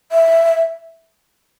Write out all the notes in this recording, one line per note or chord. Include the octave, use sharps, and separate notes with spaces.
E5